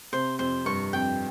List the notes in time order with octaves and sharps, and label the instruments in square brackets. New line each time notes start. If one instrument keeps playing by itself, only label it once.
[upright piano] C3 [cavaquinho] C5
[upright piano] F2 [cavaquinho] C5
[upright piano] G2 [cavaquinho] C#6
[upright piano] F2 [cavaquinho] G5